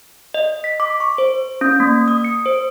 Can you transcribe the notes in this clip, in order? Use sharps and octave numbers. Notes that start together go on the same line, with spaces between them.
D#5
B6
D6
C#6
C5
C#4
A#3
D#6
C#7
C5